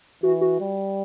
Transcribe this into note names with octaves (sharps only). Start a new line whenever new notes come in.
E3 F#4
F#4
G3